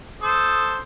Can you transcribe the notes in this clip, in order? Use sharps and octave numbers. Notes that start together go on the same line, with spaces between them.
A4 C5 D#6